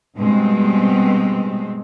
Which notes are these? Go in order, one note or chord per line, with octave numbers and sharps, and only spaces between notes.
G2 B2 G#3 C4